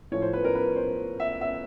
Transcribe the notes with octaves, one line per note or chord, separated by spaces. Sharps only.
A2 F3 C#5
C5
B4
A#4
B4
C5
E5
E5